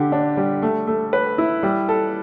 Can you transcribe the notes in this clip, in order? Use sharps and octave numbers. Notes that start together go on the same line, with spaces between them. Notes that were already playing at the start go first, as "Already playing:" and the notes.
Already playing: D3 G4
D4
G3
A3
A3
B4
E4
G3
A4